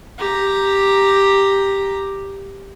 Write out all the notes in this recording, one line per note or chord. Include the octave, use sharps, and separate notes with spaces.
G4 A#5